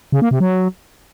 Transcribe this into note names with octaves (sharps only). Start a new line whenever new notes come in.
C#3
A#3
C3
F#3